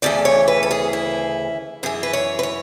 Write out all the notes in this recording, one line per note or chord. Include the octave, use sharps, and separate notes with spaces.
D2 C#3 E3 D5
C#5
B4
A4
G#4
E4
F#2 E3 G#4
B4
C#5
B4
C#5